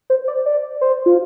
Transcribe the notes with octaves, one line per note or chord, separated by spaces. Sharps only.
C5
D5
D5
C5
F4